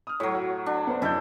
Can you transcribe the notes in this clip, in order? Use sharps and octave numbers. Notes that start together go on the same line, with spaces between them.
D#6 F6
A2 F#3 A4 C#5
F#4
D4
B3 C5
F#2 E3 A4 D#5 G6